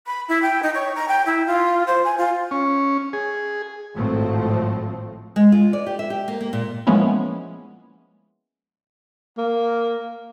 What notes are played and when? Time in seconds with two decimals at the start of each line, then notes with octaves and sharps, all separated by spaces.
0.06 B5
0.28 E4
0.42 G5
0.62 D#4
0.74 C#5
0.95 A#5
1.08 G5
1.25 E4
1.47 F4
1.87 C5
2.04 G#5
2.17 F4
2.51 C#4
3.13 G#4
3.95 G#1 A2 F3 A3 C4
5.36 G#3
5.52 F4
5.73 D5
5.86 G4
5.99 E5
6.10 G4
6.28 A#3
6.41 A#3
6.53 A#2
6.87 F3 G#3 A#3 B3 C#4 E4
9.38 A#3